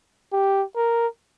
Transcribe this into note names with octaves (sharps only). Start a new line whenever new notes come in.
G4
A#4